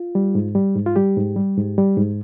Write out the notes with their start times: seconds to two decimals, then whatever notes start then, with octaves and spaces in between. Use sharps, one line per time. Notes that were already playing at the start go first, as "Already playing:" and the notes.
Already playing: F4
0.15 G3
0.35 G#2
0.55 G3
0.76 G#2
0.86 F4
0.96 G3 G4
1.17 G#2
1.36 G3
1.57 G#2
1.78 G3
1.97 G#2